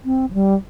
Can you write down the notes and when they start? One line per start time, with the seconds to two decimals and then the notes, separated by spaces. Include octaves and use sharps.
0.05 C4
0.31 F3
0.34 G3